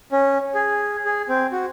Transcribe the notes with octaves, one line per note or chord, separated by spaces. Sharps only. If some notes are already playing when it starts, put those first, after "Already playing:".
C#4
G#4
G#4
C4
F#4